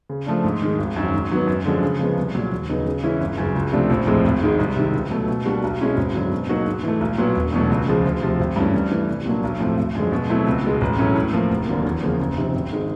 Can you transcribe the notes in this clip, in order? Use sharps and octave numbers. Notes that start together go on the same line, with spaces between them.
C#3
F3 A3 D4
G#2
D#3 G#3
G#1
F#2 D#3 F#3
G#2
D#3 F#3 B3
F#2
D3 F3 G#3
C#3
F3 G#3 B3
C2
A#2 F#3
D#2
C#3 F#3 B3 D#4
C#3
E3 G#3 C#4 E4
G1
F#2 C#3
C#2
C3 F3 A3 D4
A#1
A2 F3 G#3 C4
G#1
G#2 D#3 G#3
C2
C3 D#3
C#2
B2 F#3 A3
B2
G3 A#3 D4 F#4
B1
B2 G#3 C#4 E4
G#1
F#2 D3 F#3
B2
F#3 A#3 D#4 F#4
G#2
E3 A3
B1
A#2 F#3 B3
E1
E2 B2 F#3 A3
C#2
C#3 F3 G#3
D2
C3 F3
G#1
G2 E3 A3 C#4
G2
E3 A3
C2
A#2 F#3 A#3 D4
B1
A2 F3 A3 C4
G#1
F#2 D3 F3 G#3
B2
F#3 A3 C4 E4
C#2
B2 G#3
A1
A2 F#3 A3 C#4
A2
F3 A#3
F1
D#2 D3 F#3 A#3
E2
C#3 F3 A#3
F#1
F2 C3 D#3
G#1
D#3 G#3